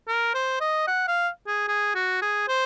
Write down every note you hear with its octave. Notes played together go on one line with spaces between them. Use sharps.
A#4
C5
D#5
F#5
F5
G#4
G#4
F#4
G#4
C5